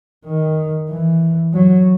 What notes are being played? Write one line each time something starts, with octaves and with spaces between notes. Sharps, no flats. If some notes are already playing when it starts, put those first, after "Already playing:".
D#3
E3
F#3